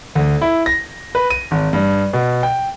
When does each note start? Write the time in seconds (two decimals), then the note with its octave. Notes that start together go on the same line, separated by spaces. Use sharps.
0.15 D2
0.41 E4
0.66 A#6
1.15 B4
1.30 D#7
1.51 G#1
1.73 G2
2.13 B2
2.43 G5